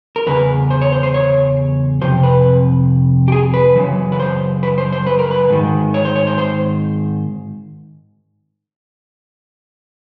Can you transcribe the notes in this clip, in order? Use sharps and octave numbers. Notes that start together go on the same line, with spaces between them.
A#4
E2 C#3 B4
C5
C#5
C5
C5
C#5
F2 C3 C5
B4
G4
G#4
B4
F#2 C#3 E3
B4
C5
B4
C5
C5
B4
A#4
B4
G#2 D#3
C#5
C5
C#5
C5
C5